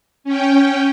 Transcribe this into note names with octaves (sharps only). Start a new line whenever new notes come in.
C#4 G5